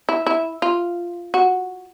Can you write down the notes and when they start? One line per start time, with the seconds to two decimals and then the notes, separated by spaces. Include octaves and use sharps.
0.09 E4
0.27 E4
0.62 F4
1.34 F#4